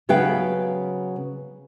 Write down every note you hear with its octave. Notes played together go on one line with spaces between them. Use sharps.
C#3 F#3 B3 B4 F5 G5